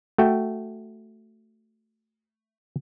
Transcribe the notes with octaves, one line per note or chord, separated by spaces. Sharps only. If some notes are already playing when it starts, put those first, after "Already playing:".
A3 F#4 G5